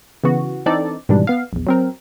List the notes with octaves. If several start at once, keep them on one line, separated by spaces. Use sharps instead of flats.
C#3 E3 B3 F#4
E3 C4 D4 D#4 A4 D5
G#2 B2 D#3 E3 G3 D4
B3 F5
A#1 E2
F#3 C4 A#4